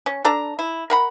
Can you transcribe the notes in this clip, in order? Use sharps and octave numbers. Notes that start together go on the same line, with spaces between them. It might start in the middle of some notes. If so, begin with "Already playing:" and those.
C#4
D4 A4 D5 A#5
E4
A#4 F#5 B5